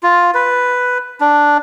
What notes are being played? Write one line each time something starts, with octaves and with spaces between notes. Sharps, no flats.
F4
B4
D4